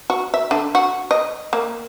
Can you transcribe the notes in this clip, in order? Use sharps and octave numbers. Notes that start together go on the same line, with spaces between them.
F#4
E5
D3
F#4
D#5
A#3